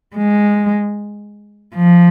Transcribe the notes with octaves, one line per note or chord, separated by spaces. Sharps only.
G#3
F3